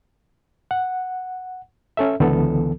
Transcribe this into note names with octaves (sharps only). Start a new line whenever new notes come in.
F#5
C#4 A4 E5
C#2 D3 E3 B3 A4